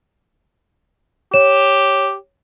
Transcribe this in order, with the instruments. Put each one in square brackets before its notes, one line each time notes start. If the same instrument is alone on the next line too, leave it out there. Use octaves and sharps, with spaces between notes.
[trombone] G4 [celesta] C#5 E7